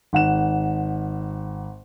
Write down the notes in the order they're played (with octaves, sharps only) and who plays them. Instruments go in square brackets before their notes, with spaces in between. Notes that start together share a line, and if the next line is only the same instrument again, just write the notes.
[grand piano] G#1 F#5 E7